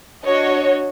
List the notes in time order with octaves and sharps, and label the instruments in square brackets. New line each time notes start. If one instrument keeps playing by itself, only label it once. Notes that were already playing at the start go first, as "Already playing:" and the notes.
[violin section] D4 F#4 C#5 D#5